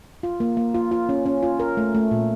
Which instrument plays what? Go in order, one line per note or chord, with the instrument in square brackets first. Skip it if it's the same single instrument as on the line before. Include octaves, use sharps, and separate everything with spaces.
[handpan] F4
A#3
A#3
F4
F4
C#4
C#4
F4
A#4
A3
A3
A#2